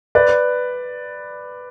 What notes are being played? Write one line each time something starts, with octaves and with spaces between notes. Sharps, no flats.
B4 D5